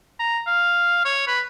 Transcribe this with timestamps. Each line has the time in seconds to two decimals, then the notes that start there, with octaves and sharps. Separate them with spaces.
0.19 A#5
0.47 F5
1.05 C#5
1.28 B4